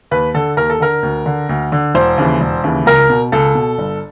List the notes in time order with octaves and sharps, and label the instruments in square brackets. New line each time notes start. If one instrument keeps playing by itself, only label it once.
[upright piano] D#2 B4
D3 A4
D#2 A#4
A4
D3 A#4
D2
D3
D2
D3
E1 C5
D#2 C#3 E3
E1
D#2 C#3 E3
C#2 A#4
B2
C#2 A4
B2
G1